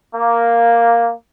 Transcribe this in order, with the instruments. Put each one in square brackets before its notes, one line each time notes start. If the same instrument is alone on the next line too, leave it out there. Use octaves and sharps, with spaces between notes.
[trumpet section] A#3